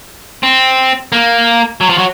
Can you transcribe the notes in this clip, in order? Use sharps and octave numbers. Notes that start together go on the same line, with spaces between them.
C4
A#3
F#3
F3
F#3